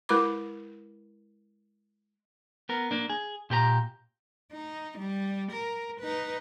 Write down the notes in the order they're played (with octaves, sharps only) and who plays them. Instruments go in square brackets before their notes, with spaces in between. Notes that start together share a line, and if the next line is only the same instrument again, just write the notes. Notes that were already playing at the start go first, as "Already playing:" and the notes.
[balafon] G#3 E4 A#4 B4 B5 D6
[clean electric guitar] B3 A#4
A#3 D4
G#4
A#2 G4 G#4 A#5
[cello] D#4
G3
A#4
D#4 B4